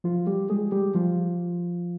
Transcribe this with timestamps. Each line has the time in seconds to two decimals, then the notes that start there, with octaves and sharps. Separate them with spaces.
0.04 F3 F4
0.27 G3 G4
0.50 G#3 G#4
0.72 G3 G4
0.95 F3 F4